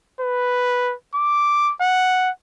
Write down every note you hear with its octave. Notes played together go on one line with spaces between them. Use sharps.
B4
D6
F#5